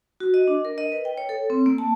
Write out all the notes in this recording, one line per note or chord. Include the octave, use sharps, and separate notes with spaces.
F#4
D#5
D4
A#4
D#5
B4
G5
C#5
A4
C4
A#3
A5